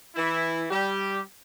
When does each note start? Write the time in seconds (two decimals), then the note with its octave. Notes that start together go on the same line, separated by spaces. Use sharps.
0.16 E3 E4
0.71 G3 G4